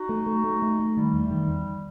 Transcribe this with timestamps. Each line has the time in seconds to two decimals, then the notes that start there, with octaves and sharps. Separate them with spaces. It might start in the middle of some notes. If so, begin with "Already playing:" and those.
Already playing: D#4 F#4
0.09 A3
0.27 A3
0.44 A3
0.62 A3
0.80 A3
0.97 D#3 G3
1.13 E2
1.31 D#3
1.48 E2